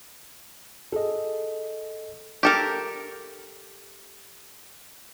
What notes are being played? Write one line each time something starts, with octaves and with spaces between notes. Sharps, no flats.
G#4 A4 D#5
G4 A4 A#4